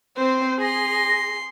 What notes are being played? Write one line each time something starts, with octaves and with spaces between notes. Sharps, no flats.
C4 C5
G#4 C6 A#6